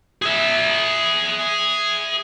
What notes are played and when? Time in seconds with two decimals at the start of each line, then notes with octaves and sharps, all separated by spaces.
0.22 G#4 E5